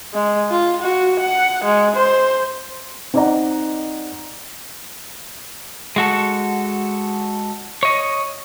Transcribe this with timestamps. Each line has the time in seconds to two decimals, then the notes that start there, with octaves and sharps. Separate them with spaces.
0.13 G#3
0.51 F4
0.81 F#4
1.20 F#5
1.64 G#3
1.96 C5
3.14 C4 D#4 D5 D#5 F#5 A#5
5.96 G#3 F#4 A4
7.83 C#5 D#5